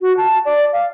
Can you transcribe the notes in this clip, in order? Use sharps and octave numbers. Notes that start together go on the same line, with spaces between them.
F#4
A5
D5
F5